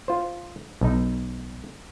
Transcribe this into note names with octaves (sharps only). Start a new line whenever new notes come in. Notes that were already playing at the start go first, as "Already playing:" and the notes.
F4 C5
B1 D#4